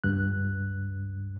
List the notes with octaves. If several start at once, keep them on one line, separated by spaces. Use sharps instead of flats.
C#2 G2 F#6